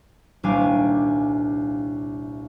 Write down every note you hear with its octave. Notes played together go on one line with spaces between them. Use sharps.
D#1 C2 D4 F5 G#5 D6